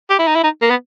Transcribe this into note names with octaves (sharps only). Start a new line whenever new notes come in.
G4
E4
D#4
E4
D#4
A#3
B3